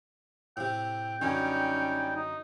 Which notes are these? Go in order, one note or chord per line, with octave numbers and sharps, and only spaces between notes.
A2 C3 G5
F#2 D3 G3 C#4 D#4
D#4